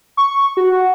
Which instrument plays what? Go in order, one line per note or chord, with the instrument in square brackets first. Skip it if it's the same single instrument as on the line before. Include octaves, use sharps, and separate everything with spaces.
[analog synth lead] C#6
F#4